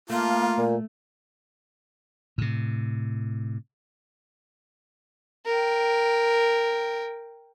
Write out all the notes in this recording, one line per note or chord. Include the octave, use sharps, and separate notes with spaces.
A3 A#3 F4
A#2
A2 C3
A#4 G5